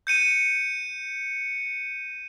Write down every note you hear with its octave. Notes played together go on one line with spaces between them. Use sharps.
G6 C#7 D#7